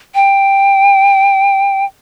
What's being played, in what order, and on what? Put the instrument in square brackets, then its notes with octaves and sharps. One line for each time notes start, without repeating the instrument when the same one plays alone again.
[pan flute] G5